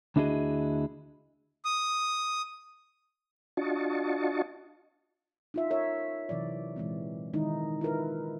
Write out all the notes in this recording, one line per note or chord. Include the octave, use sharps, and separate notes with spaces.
D2 D4 E4 F#4 G#4 D#5
D#6
D4 F4 F#4 D#5 A5 C#6
D#4 F4 E5
F4 A#4 C#5 E5
C3 E3 F#3 D5
A#2 E3 G#3 C4
D#3 E3 G#3 D#4 E4
E4 F4 A#4 B4